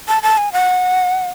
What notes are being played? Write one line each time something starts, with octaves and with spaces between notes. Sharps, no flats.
A5
A5
G#5
F#5